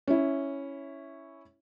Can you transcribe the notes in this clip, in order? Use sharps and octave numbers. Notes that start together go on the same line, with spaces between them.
C#4 E4